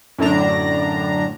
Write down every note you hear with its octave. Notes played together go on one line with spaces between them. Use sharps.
F#2 A2 D3 D4 A#5